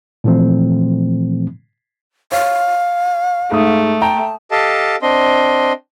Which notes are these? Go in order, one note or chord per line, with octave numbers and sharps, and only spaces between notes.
A#2 E3 F3 A3 C4
C#5 F5
G#2 A3 D#6
G5 A5 A#5
G4 A4 D#5 F5 A5
C4 D4 D#5 C6